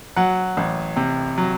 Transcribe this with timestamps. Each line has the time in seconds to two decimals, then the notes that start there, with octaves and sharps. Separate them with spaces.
0.16 F#3 F#5
0.57 A1
0.96 C3
1.38 F#3